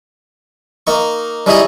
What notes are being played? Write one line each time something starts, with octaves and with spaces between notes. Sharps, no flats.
A#3 D#4 C#6
G3 C#4 D#4 E4 G#4 D#5